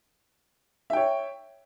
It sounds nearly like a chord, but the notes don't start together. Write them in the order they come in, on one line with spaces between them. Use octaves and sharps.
E5 G5 C#5